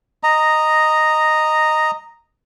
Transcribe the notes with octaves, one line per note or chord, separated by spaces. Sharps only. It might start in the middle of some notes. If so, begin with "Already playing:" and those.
D#5 A#5